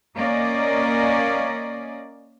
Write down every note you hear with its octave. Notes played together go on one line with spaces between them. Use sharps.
A#3 C#4 D5 D#5